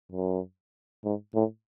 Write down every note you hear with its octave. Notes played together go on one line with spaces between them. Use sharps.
F#2
G#2
A2